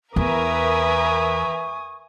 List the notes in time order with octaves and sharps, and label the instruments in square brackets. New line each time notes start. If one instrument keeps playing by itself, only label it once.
[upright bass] E2 [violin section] A#4 B4 E5 [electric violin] G#5 D#6 [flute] C#6